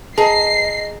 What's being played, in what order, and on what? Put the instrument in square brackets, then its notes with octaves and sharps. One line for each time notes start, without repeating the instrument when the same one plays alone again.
[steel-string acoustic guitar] G#4 A#5 [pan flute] D#5 [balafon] A5 [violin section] C7